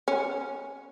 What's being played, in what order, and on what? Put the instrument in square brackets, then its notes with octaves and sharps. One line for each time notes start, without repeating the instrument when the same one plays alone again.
[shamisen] C#4